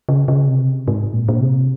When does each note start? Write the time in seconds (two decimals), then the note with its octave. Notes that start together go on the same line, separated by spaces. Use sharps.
0.09 C#3
0.28 C#3
0.48 C3
0.88 G#2
1.13 A#2
1.29 A#2
1.40 C3